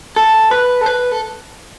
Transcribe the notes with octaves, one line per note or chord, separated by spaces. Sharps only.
A4
B4
A4
B4
A4